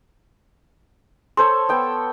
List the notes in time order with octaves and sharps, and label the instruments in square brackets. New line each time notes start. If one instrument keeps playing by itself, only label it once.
[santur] A4 C5 C#5 [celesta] C6
[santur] B3 G5 A5